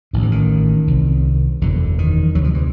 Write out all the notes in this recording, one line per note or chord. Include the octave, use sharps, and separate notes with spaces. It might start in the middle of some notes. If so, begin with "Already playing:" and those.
A1 A2 D#3
E3
D#3
C2 C3
F#1 E2 B2 D3
D#3
D2 C3 F#3
F3
E3